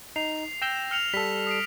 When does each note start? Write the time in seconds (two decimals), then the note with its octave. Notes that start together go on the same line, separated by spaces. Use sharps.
0.16 D#4 C7 F7
0.62 G5 E6 G6 A#6 E7
0.91 F6 C#7 F7
1.14 G3 A4 B6
1.47 D#6 C7 D7